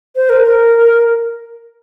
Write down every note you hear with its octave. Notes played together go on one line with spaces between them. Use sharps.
C5
A#4
A#4